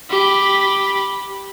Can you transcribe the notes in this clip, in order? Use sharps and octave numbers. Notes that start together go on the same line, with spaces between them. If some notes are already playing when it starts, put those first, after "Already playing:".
G4 B5